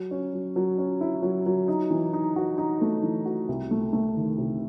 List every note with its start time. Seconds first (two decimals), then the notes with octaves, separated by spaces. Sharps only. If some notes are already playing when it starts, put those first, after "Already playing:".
Already playing: F#3
0.11 C#4
0.33 F#3
0.56 F#3
0.78 C#4
1.01 E4
1.22 F#3
1.46 F#3
1.68 D#4
1.91 E3
2.13 D#4
2.36 F#4
2.58 D#4
2.81 A3
3.03 E3
3.26 F#4
3.49 C2
3.71 A3
3.93 A3
4.16 D#3
4.38 C3